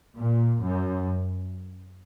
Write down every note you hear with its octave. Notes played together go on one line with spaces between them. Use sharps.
A#2
F#2